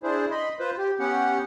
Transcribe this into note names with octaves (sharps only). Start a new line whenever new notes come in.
D4 E4 G#4 C5
D#5 B5 C6
F4 B4 C5
G4
B3 C#4 G4 F#5